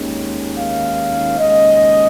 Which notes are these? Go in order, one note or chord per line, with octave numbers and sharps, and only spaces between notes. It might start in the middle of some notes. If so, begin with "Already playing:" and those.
Already playing: D#2 D#3 G#3 C#4
F5
D#2 C#3 G#3 C#4 D#5